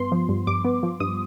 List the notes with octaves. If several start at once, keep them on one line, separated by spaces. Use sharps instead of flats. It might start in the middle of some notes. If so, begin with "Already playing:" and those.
Already playing: G2 B3 C6
F3
G2
G2 D6
B3
F3
G2 D#6